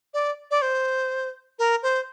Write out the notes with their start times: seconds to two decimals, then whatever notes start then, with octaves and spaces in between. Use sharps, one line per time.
0.14 D5
0.51 D5
0.62 C5
1.59 A#4
1.83 C5